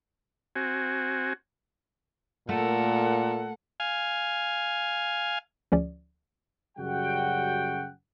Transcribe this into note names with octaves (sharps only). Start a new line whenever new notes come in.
C4 F#4 G#5
A#2 A3 A4 A#4 F#5
F5 G#5
D2 F3 C#4 G#4 D5
F#2 C#3 G3 F#4 F#5 G5